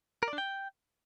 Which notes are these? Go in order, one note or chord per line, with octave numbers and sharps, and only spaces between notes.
A#4
D5
D4
G5